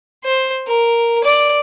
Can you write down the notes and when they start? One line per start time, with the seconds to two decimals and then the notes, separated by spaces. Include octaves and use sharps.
0.24 C5
0.67 A#4
1.24 D5